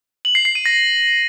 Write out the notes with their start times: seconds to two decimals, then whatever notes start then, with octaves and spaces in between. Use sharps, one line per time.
0.25 F#7
0.35 C7
0.45 C7
0.55 D#7
0.66 A#6